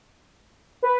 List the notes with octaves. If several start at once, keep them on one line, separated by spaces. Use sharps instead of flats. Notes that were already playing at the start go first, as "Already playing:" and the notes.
B4